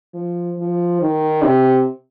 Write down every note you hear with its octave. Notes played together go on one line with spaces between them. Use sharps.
F3
F3
D#3
C3